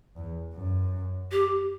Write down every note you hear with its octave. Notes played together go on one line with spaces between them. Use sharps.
E2
F#2
G4